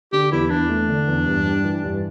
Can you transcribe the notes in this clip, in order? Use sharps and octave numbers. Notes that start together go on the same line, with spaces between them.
D3 G4
E2 E4
E2 D4
A3
D3
E2
G2
G3
E3
G2